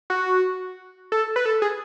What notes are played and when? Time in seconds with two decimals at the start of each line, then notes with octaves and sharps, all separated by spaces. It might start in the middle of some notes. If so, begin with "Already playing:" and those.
0.10 F#4
1.12 A4
1.36 B4
1.46 A4
1.62 G#4